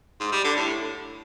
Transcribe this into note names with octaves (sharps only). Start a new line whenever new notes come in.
G#2
G3
D3
A2